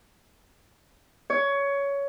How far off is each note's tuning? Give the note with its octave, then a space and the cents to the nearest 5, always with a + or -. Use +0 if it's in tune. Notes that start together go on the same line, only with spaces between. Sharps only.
C#5 +15